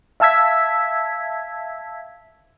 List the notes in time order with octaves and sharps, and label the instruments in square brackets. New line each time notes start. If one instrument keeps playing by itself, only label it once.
[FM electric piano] E5 F5 A5 E6 G#6 B6